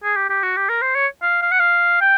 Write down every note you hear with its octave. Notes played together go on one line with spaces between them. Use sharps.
G#4
G4
G4
F#4
G4
A#4
C5
C#5
F5
F5
F#5
F5
G5